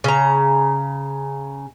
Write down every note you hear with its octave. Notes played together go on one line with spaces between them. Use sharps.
C#3 A#5